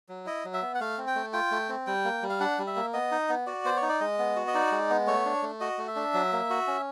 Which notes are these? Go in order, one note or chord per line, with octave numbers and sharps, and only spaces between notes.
F#3
E4 D#5
F#3
E5
B3
F#5
A3 F5
C4
G5
A3
F4 G5
A3
C4
G3 G5
A#3
G3
F5
D4 F#5
G3
E5
A#3
B3 D#5
D#4
B3
F#4 D5
B3 C5
C#5
D#4
D5
G#3 D#5
B3
F#4
D#5
D#4 D5
G#3
B3
A3 C#5
D4
A3
F#4 D#5
A3
E5
D4
F#3
A#3
F#4
C#4